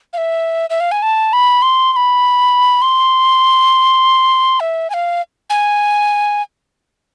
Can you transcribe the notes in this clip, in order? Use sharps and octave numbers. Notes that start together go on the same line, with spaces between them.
F5
E5
E5
F5
G#5
A5
B5
C6
C6
B5
C6
E5
G#5
F5
G#5